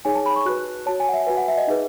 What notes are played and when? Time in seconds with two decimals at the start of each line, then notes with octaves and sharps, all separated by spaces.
0.05 D#4 G#4 C#5 G#5
0.15 A5
0.26 B5
0.36 C#6
0.46 F#4 B4 F#6
0.86 F#4 C#5 A5
1.00 G#5
1.09 F#5
1.14 E5
1.27 F#4 B4 G#5
1.37 F#5
1.48 E5
1.58 D#5
1.68 D#4 G#4 B4